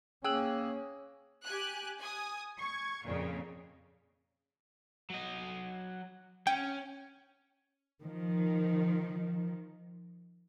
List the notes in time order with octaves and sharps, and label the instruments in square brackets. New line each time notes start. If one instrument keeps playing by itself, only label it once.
[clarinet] A#3 [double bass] C#4 [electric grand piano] G#4 E6 [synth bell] G5 F#6 F#7
[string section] G4 G#5 F#6
G#5 D#6
C#6 G#6
F2 A#2 C#3
[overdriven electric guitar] F#3 D#5
[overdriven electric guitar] C#4 [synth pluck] G5
[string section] D#3 F3